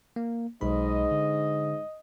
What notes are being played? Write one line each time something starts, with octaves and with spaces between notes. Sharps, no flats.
A#3
B1 G#2 G#3 D#5 B5
D3